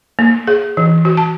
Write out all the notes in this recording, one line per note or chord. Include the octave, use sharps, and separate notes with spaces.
A#3
G#4
E3
F#4
A5